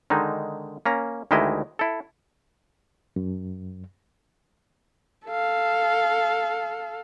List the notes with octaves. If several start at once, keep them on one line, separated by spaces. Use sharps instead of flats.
D3 D#3 G#3 D#4
A#3 C#4 A#5
D2 D#3 G#3 E4 G4 D#5
E4 A4
F#2
A4 F5